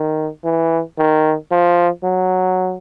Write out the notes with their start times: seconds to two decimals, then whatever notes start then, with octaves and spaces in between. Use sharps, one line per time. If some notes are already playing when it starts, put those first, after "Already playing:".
Already playing: D#3
0.44 E3
0.98 D#3
1.51 F3
2.03 F#3